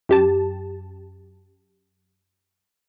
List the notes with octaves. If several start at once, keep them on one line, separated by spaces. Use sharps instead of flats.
F#2 G4 A5